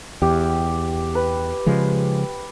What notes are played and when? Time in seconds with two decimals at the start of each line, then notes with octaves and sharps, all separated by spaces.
0.22 E2 G4
1.15 B4
1.66 C#3 F3 G#3